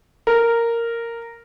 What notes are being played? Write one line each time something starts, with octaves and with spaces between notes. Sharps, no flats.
A#4